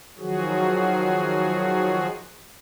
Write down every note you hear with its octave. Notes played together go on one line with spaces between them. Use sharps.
D#3 F3 F#3 F#4 G#4